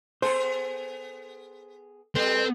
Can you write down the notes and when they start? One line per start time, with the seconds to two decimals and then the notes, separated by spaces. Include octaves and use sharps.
0.22 B3 G#4 A4 C5
2.15 G3 C4 A4 B4